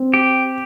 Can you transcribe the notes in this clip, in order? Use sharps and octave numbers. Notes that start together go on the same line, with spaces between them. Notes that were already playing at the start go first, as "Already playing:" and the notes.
Already playing: C4
G4